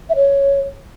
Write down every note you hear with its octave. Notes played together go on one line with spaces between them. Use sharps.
E5
C#5